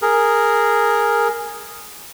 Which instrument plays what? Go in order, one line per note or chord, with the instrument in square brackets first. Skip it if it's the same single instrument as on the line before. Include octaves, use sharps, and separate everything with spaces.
[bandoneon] G#4 A#4